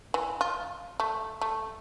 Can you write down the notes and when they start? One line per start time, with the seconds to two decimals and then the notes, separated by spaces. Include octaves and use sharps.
0.14 E3
0.41 F4
1.00 A3
1.41 A3